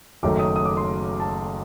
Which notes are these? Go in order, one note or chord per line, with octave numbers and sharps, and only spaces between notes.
F#1 F#2 D#3 A3 D6
D#6
D#6
D6
C6
A5